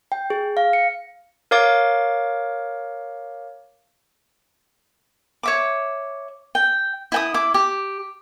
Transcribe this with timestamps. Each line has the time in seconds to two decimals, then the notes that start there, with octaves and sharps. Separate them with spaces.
0.12 G5
0.30 G#4
0.57 F5
0.73 C#7
1.51 A#4 C#5 F5 D6 A6
5.43 C#5 E5 D6
6.55 G5
7.12 E4 G5 D#6
7.34 E4 D6
7.54 G4